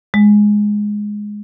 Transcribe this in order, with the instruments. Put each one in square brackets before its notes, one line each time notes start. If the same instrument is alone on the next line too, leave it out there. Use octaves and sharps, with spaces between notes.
[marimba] G#3